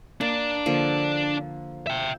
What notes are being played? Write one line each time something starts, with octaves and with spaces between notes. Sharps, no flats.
A#3 D4 D5
D3 F3 A#3
E5 G5